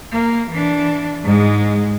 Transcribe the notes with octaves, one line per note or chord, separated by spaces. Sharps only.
A#3
E3 D4
G#2 G#3